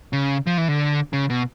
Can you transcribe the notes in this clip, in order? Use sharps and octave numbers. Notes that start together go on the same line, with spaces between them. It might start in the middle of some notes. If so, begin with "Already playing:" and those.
C#3
F3
E3
D3
C#3
B2